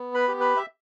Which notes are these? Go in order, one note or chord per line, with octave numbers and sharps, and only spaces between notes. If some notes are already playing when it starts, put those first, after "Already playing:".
Already playing: B3
B4 B5
G4
B4 B5
E5